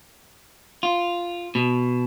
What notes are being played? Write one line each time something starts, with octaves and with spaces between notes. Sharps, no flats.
F4
B2